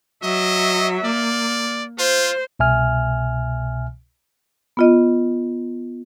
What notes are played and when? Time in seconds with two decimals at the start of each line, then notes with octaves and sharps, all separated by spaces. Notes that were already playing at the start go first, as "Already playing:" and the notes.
0.23 F#3 D#5 E5
1.05 A#3 D5
1.99 F4 C5
2.59 C2 B2 E5 G#5 F6
4.77 B3 F4 D#5